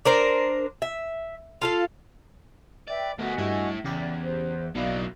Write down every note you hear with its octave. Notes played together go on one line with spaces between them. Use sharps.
D4 A#4 C5
E5
F4 A4 F5
B4 D5 E5 G5
D2 A3 B3 F#4 D#5 G#5
G2 A3 E4 A4 G#6
E2 C#3 G4 D5 B5
C5
B1 F#3 A#3 D#4 E4 D5 F5 F#6